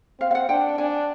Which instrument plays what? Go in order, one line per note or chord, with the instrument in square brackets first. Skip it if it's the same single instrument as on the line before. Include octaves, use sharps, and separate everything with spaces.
[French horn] C4 [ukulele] F5
[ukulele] F5
F#5
[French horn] D4 [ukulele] G5
[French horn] D4 [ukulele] G#5